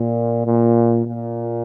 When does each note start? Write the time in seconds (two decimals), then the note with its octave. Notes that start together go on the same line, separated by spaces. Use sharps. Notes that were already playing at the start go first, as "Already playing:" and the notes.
Already playing: A#2
0.46 A#2
1.05 A#2